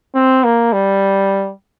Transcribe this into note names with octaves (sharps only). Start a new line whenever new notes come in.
C4
A#3
G3